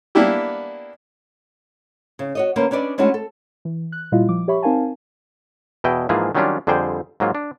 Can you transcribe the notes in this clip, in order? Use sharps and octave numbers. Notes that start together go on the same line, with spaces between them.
A#3 B3 D4 E4 G4
C#3
F#4 C#5 D#5
D3 A#3 C#4 B4 C5
C#4 D4 B4 D5 D#5
G#3 A3 C#4 D4 E4 F#4
A4
E3
F#6
A#2 G3 E4 F4 D#5 F5
F3 D6
G4 C#5 E5 B5 C#6
C4 D#4 A#4 F5 G#5 A5
E2 B2 E4 D#5 G5
G#2 E3 F3 A#3 F4 G#4
D#3 F#3 G3 C#4 D4 F4
F2 D3 G3 G#4 C5 G5
G#2 F#3 A#3 F4
D4